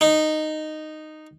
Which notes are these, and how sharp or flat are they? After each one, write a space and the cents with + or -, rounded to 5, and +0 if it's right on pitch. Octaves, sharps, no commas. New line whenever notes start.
D#4 -10